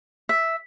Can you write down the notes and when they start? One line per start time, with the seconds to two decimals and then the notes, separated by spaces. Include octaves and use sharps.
0.29 E5